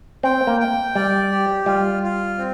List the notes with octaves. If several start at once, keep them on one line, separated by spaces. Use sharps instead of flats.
C4 G5
A#3
G5
G3 D5
G4
G3 F4
F4
C4